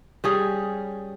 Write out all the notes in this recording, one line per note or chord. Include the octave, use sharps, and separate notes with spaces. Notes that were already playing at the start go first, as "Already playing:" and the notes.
G3 C#4 G#4